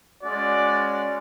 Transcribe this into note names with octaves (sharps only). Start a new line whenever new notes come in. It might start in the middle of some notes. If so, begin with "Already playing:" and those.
G#3 C#4 F#4 D5